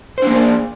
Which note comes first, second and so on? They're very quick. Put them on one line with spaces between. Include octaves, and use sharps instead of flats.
C5 D4 A#3 G#4 D5